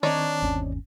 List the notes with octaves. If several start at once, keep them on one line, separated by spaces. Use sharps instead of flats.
D#3 C4 D4 D#4 C#5 D5
G1 D#2 C#4